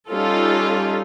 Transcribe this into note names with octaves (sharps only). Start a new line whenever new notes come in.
G3 C#4 D#4 F4 A4